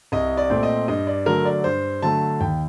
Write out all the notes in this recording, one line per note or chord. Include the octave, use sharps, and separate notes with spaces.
C2 D#5
D5
A#2 A3 C4
D#5
G2 D#5
D5
D3 F#3 A3 A#4
D5
G2 C5
D3 F#3 A3 A5
D#2 G5